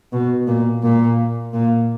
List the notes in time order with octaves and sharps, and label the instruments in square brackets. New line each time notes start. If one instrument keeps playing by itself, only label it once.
[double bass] B2
A#2
A#2
A#2